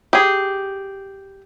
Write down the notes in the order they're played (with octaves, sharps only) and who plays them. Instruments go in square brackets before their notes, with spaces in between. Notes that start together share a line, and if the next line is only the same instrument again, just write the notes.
[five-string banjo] G4 G#4